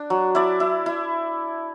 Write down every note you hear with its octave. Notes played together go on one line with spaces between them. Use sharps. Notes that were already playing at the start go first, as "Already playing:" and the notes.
Already playing: D4
F#3
E4 D5
E4
E4